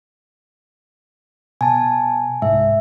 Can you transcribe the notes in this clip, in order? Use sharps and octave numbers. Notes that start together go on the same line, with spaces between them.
B2 G#5 A5
C2 G#2 E5